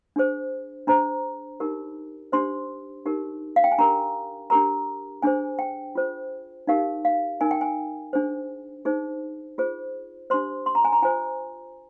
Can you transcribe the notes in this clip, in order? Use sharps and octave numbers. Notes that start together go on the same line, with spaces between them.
D4 G#4 C5
D4 G#4 C5 A#5
D#4 G4 A#4
D4 G4 C5 C6
D#4 G4 A#4
F5
G5
G#5
D4 G4 A#4 A#5
D4 G4 A#4 A#5
D4 G#4 C5 G#5
G5
F4 G#4 C5
D#4 G4 A#4 F5
F5
D#4 A#4 G#5
G5
G#5
D4 G#4 C5
D#4 G#4 C5
F4 G#4 C5
D4 G4 C5 C6
C6
A#5
G#5
A#5
F4 C5 G#5